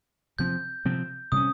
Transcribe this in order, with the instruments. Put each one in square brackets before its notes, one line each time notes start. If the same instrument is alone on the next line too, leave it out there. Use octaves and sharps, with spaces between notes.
[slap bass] C3 F3 C4 [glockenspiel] G6
[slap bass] C3 F3 C4
[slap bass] C3 G3 C#4 [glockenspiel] D#6